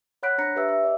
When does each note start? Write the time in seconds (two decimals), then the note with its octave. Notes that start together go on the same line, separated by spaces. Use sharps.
0.23 C#5 F#5 B5 F#6 B6 D7
0.38 D4 C5 A#5 A#6 C#7
0.56 G4 B4 E5 E6
0.69 E5
0.84 D5 D#5